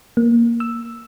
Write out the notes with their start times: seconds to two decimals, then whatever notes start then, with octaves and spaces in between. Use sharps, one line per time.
0.17 A#3
0.60 E6